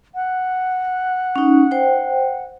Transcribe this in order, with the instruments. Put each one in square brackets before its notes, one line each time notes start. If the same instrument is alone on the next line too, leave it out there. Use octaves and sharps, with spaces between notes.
[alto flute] F#5
[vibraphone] C#4 D#4
C5 G5